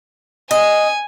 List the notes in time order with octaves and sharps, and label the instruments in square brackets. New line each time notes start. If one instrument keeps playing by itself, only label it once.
[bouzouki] D#5 [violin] G#5